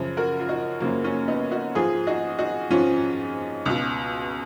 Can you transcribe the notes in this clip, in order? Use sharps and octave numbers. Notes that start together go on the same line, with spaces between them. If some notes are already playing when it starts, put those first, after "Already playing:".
Already playing: F#2 C#3 F3
F#4 A#4
F4
D#4 F#4
F#2 C#3 F3 F#3 A#3
A#3 C#4
B3 D#4
D#4 F#4
G#2 F3 F4 G#4
D#4 F#4
D#4 F#4
G#2 F3 C#4 F4
C#2 B2